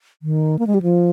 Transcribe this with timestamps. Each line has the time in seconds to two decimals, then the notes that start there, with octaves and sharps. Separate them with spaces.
0.22 D#3
0.59 A#3
0.67 G#3
0.74 G3
0.82 F3